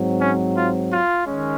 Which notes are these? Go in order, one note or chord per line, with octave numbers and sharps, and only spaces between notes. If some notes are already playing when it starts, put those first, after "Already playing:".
Already playing: G#2 F#3 C4
C#4
F4
F4
D#3 G#3 C#4